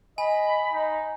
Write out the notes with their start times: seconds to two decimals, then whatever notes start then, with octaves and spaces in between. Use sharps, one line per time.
0.18 D#5 G#5 B5
0.73 D#4